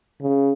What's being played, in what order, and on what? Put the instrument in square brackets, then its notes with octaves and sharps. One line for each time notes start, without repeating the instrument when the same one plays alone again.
[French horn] C#3